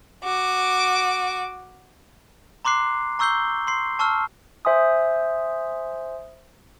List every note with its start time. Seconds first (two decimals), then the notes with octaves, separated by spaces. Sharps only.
0.23 F#4 D6
2.65 A#5 C6 D6 F#6 C7
3.19 A#5 C#6 E6 G6 C7 G7
3.67 C6 C7
3.99 A5 C#6 E6 F6
4.65 C5 E5 G#5 C6 D#6